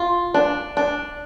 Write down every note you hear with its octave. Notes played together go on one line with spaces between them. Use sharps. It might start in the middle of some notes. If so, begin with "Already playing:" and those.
Already playing: F4
D4
D4